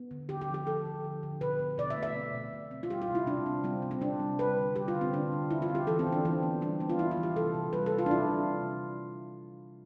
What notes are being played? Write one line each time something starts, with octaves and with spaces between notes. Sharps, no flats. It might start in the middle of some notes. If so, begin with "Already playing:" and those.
Already playing: B3
D3
D3 G4
G4
F3
G4
F3 A4
F3
D3
D3
B2 B4
B2
B2 D5
E5
A3
E5
C4
B2
B2
C4
F4
G3 G4
F4
C3
E4
C3 D4
C4
G3 C4
C3
C4
C3 D4
G3
G3 B4
D3
G3 G4
F4
D3
C4
D3 D4
D3
D3 E4
F4
C4
G4
E3 A4
C4
E3
D4
E3 C4
B3
G3 D4
B3
F4
E3 E4
F4
E3
G4
C3 A4
C3
G3 B4
A4
C3
F4
D4
C3 E4
C3